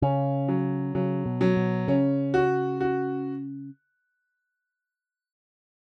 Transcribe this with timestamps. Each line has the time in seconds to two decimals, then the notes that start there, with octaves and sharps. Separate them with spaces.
0.02 C#3 C#4
0.48 F#3
0.95 C#3 F#3
1.26 B2
1.41 F#3
1.57 B2
1.88 C#3 C#4
2.34 F#4
2.81 F#4